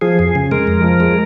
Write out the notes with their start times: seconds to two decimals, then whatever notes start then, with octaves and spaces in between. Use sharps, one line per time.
0.01 F3 G#4
0.19 F2
0.35 C#3
0.51 G#3 A#4
0.67 F2
0.84 F3
1.00 G#3